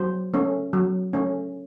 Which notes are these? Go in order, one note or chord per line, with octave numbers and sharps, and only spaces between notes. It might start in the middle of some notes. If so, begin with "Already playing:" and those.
Already playing: F#3 C5
A3 C#4
F#3
A3 C#4